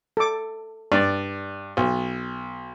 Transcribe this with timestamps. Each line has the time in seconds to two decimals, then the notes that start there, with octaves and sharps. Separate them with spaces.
0.17 A4 D6
0.92 G2 D5
1.77 B1